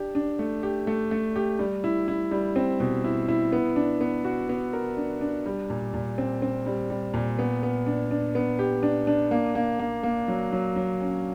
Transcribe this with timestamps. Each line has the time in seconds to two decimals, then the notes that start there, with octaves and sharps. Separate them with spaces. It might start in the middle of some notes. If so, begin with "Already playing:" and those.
Already playing: D4 G4
0.15 D4
0.39 A3
0.63 G4
0.87 A3
1.11 A3
1.36 G4
1.59 G3
1.84 E4
2.08 E4
2.31 G3
2.56 C4
2.80 B2
3.04 E4
3.28 E4
3.53 B3
3.76 D4
4.01 B3
4.24 F#4
4.49 B3
4.73 A#4
4.97 D4
5.21 D4
5.46 G3
5.70 A#2
5.94 A#2
6.18 C4
6.42 C4
6.66 G3
6.90 G3
7.14 A#2
7.39 B3
7.63 B3
7.86 D4
8.11 D4
8.35 B3
8.59 G4
8.83 D4
9.07 D4
9.31 A#3
9.55 A#3
9.79 A#3
10.03 A#3
10.28 F#3
10.52 F#3
10.76 F#3
11.00 C#4